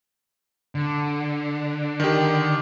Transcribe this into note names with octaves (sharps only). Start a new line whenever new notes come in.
D3
D#3 G4